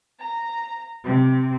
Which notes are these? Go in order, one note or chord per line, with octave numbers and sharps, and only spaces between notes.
A#5
C3